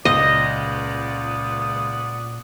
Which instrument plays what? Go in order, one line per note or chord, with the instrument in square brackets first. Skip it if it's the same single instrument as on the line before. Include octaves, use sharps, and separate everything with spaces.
[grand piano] C#2 [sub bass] A#2 [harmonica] D5 F#5 D#6 [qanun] D#5